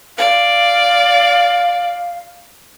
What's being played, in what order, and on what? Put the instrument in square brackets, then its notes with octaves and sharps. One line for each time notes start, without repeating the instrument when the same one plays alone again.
[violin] D5 [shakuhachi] F5